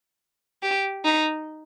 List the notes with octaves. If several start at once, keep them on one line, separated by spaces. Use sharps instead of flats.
G4
D#4